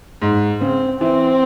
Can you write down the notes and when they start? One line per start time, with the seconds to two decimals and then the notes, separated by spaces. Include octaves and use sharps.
0.22 G#2
0.61 C#3 C4
1.00 E3 C4